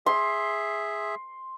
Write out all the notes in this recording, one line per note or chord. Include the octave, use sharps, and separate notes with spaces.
G#4 E5 C6